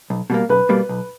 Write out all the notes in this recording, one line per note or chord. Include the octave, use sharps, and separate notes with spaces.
B1
B2 G3 A#3
B1 B4
B2 G3 A#3
B1